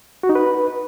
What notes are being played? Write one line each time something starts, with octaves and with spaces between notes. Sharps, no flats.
F#4
D#4
B4